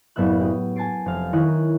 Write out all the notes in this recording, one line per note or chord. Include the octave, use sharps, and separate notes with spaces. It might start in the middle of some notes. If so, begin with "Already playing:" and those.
F#1 A2 B3 E5 F#6
G4 D#6
G#5 A5 G#6 A6 C7 D7
F1 F5
D#3 E4 A#4 C#5 D#6 F#6